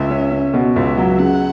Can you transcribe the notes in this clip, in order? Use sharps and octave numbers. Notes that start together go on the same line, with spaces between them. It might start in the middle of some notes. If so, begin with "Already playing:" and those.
Already playing: C#2 E5
C#4
C#4
B2
C#2 E5
F#3
C#3 F#5